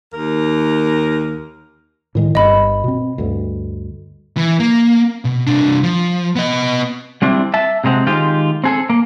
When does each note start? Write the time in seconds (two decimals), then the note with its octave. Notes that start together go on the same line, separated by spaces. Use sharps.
0.14 D#2 A#4
2.15 A2 D#3 G#3
2.35 G1 G2 D#5 B5
2.84 B2 C4
3.18 D2 G2
4.37 E3
4.60 A#3
5.25 B2
5.47 C2 D4
5.83 F3
6.36 B3 D#5
7.22 G3 C4 D4 E4
7.54 E5 A5
7.84 C3 F#3 G#3 C4
8.07 D#3 G#3 F4 G4
8.64 C4 G#4 A4
8.90 A#3